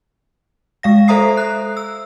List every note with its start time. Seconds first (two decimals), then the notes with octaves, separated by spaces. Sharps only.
0.83 G#3 F5 A#6
1.08 A4 C5 E5 A#5 D#6 C7
1.37 F#6
1.77 E6